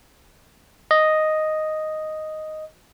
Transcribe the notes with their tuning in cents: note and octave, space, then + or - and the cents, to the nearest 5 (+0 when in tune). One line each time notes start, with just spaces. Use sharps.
D#5 +0